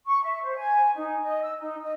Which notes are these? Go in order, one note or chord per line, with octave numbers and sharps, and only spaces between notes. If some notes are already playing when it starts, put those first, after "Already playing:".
C#6
E5
C5
G#5
D#4
D#5
E6
D#4
D#5